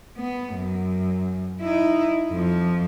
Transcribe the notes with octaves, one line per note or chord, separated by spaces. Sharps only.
B3
F#2
D#4 E4
F2 F3